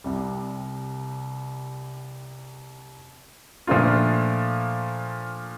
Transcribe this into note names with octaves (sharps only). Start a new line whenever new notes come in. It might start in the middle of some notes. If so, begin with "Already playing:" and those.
C2 C3 G3
A#2 F3 A3 D4 F4